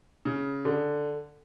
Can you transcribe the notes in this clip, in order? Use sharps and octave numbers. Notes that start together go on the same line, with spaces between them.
C#3
D3